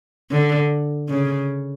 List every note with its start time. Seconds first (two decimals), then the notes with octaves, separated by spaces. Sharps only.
0.31 D3
1.09 C#3